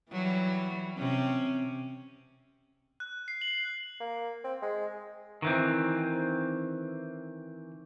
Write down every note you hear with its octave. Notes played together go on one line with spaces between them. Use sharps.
E3 F#3 G3
C3 C4 C#4
F#6
C7
F#7
A#3
C4
G#3
D#3 E3 C4